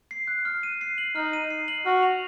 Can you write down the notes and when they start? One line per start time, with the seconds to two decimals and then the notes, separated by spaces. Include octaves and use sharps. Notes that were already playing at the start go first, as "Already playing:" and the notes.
0.11 C7
0.28 F#6
0.45 F6
0.63 D#7
0.81 C7
0.98 F#7
1.16 D#4 F6
1.33 D#7
1.50 C7
1.68 F#7
1.86 F#4 F6
2.03 F7